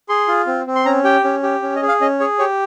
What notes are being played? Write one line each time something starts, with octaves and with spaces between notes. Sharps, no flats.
G#4 C6
F4
C4
C4
C6
C#4 A#5
G4 G5
C#4
G4
C#4
D#5
G#4
F5
C#4 D#5
G#4 C#5
G4 C#5